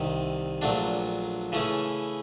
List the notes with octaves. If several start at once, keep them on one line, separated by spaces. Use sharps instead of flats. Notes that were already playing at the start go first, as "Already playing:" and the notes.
Already playing: C2 C3 D#3
A#1 A#2 F#3 A3 D4
C#3 E3 A3 C#4 E4